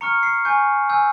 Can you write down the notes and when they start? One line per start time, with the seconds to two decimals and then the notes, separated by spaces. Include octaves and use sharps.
0.01 A#5 C#6 F6 C#7
0.23 C7
0.45 G#5 C#6 G6
0.90 G#5 E6 G6